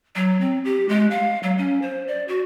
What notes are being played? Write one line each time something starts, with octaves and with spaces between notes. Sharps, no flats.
F#3
C4
G4
G#3
F5
F#3
C#4
C5
D5
F#4